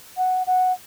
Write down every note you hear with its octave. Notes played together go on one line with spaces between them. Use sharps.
F#5
F#5